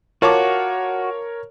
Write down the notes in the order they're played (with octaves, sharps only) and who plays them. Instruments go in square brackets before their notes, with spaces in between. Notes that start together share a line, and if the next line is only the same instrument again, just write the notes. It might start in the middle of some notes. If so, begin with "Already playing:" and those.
[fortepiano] F4 A5 D6 [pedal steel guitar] F#4 [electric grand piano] A#4 C#5